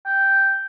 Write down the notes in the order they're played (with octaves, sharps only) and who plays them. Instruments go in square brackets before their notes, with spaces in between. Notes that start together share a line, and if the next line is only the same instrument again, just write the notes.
[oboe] G5